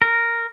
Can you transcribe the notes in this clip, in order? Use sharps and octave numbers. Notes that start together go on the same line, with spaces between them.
A#4